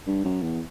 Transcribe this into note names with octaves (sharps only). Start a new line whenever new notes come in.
G2
F#2
E2